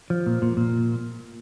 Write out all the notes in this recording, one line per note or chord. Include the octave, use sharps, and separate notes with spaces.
F3
A#2
A#2
A#2